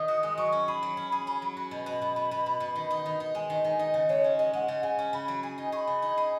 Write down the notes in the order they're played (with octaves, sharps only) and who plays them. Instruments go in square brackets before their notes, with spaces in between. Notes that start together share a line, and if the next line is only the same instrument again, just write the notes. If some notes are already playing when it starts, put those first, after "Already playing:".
Already playing: [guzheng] D#3 D#4 [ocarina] D#6
[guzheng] F#4
G#3
[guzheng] F#3 [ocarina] C#6
[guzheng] C#4
[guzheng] G#4 [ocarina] B5
[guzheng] F#3
C#4
G#4
C#4
F#3
[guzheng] F#4 [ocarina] B5
[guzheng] B2
B2
B2
B2
B2
B2
B2
D#3
D#4
D#3
D#4
[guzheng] G#3 [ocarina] G#5
[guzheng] D#3
[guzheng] D#3 [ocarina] G#5
[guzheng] D#4
C#3
[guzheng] G#3 [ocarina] C#5
[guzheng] C#4
[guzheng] G#3 [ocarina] D#5
[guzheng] G#3 [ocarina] F#5
[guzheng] C#3
[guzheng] C#3 [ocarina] G#5
[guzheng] C#4
[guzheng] C#3 [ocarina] B5
[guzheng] F#3
[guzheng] G#4 [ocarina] G#5
[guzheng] D#4
[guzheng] G#4 [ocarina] C#6
[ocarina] B5
[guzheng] C#3
D#4
G#4